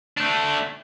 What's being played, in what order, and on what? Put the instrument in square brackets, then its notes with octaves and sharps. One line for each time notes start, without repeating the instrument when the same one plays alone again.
[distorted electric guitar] A3 D4